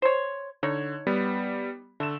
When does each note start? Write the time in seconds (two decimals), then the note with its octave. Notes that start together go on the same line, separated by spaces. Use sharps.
0.02 C5 C#5
0.63 D3 D#4 C#5
1.07 G3 B3
2.00 D3 A3 E7